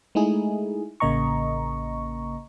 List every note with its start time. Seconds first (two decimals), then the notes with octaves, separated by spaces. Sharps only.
0.15 G#3 A3 D#4 E4 G#4
1.00 A1 C#3 A#3 D#5 A#5 C#6